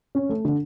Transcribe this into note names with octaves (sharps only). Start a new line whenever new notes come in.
C#4
A3
D3